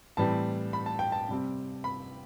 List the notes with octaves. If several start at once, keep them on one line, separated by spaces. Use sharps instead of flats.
A2 E3 G3 C4 A5
B5
A5
G5
A5
C3 G3 C4
B5